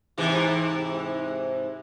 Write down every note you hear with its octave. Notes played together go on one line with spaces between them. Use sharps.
G#2 C3 E3